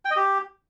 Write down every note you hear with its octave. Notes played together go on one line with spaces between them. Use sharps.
G5
D#5
G4